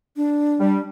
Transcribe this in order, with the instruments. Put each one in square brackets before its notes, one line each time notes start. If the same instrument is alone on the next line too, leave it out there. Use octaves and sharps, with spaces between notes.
[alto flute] D4
[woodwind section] G3